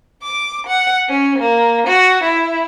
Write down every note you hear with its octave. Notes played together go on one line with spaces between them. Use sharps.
D6
F#5
C#4
A#3
F#4
E4